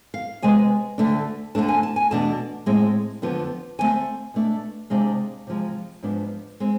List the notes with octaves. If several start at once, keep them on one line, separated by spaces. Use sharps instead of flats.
F5
C3 G#3 B3 G#5
D2 D3 A3 D4
D2 D3 A3 D4 A5
G#5
A5
G#5
E2 B2 A3 D4 A5
A2 G#3 C4
F2 D3 F3 B3 D4
D2 D3 A3 C4 G#5
B2 A3 D4
C3 G#3 D4 F5
C3 F3 G#3
G#2 F3 B3 D4
G#3 C4